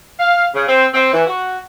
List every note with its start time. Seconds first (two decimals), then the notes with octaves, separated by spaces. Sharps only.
0.19 F5
0.55 C#3
0.68 C4
0.94 C4
1.13 E3
1.27 F#4